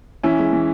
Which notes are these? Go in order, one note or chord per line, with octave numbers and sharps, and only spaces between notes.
E3 C#4 E4
G#3
E3